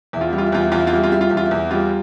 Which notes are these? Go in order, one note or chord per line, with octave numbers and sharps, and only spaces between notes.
E2 E4
F4
G3 E4
F4
E4
E2 F4
E4
E2 F4
E4
F4
G3 E4
F4
G3 E4
F4
E2 E4
F4
E4
E2
G3 F4